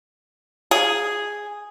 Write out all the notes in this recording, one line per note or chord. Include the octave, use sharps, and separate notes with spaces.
G#4